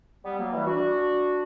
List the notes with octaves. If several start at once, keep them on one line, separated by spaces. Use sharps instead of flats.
G3 B3
F#3 A#3
E3 G3
D4 F#4